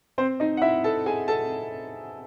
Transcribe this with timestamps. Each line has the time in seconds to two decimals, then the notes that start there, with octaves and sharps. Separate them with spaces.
0.18 C4 C5
0.40 D#4 D#5
0.57 F#5
0.62 E4 E5
0.84 A4 A5
1.06 G#4 G#5
1.28 A4 A5